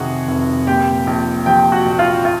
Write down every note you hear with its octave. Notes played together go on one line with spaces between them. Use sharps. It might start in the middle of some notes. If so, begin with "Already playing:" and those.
Already playing: F2 C3 D#3 F#4 G#4 F#5
F1
A#2 G4 G5
A#1
F3 G4 G5
F#4 F#5
A#1
F4 F5
F4